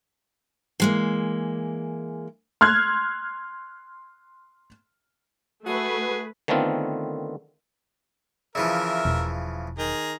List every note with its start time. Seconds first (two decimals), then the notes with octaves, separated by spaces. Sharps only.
0.80 E3 G#3 A#3
2.61 C6 F6 F#6 G#6
5.66 A3 F#4 G#4 B4
6.48 D3 D#3 A3 B3 C4 F4
8.55 C#3 E3 F3 A#4 E5
9.05 E1
9.78 D#3 G#4 A#5